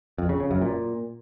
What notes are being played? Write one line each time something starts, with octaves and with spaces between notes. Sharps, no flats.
F2
C#3
C#3
F#2
A#2